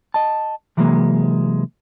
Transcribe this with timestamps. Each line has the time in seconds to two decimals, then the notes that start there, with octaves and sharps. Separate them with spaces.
0.14 D#5 A5
0.77 C3 E3 F#3 G#3 A#3